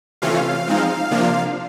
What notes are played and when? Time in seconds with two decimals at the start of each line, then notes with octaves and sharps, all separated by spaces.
0.22 C3 E3 A3 C#4 F4 F5
0.67 F3 G#3 C4 D#4
1.11 C3 F3 A#3 D4 F4